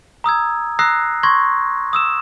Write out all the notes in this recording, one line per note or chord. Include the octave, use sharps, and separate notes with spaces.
A#5 D#6 E6 G#6
A#5 D#6 E6 F#6 A#6 C7
C6 C#6 G#6 A#6
D#6 E6 E7